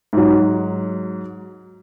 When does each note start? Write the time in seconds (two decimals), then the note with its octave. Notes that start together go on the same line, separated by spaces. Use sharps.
0.13 G#2 F#3